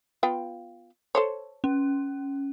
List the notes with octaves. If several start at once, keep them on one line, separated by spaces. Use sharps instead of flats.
B3 F4 G5
A4 C5 C#5
C#4